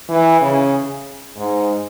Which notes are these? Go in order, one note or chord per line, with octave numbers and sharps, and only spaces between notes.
E3
C#3
G#2